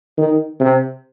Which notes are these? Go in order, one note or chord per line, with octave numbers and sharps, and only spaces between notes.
D#3
C3